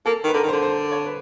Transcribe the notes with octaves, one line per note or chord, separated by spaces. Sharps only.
A#3 A4
D#3
B4
D3 A#4
D#3
C5
D3
C5
C#5
B4